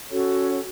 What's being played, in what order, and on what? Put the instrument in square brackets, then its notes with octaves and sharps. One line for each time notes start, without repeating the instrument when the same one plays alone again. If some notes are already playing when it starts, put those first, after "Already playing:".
[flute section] C#4 F#4 A4 C#5